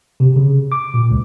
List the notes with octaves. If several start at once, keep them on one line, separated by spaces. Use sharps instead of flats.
C3
C#3
D6
A#2
C#2